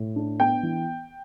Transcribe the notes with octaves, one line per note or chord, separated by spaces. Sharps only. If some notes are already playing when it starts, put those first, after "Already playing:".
Already playing: A2
D4
B3 G5
E3